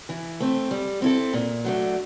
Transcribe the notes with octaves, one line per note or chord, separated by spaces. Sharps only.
E3
A3 C4
G3
C4 E4 A4
A#2
F#3 A3 D4